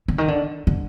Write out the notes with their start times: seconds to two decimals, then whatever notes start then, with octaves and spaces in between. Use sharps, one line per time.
0.08 D3
0.18 D#3
0.28 D3
0.67 D3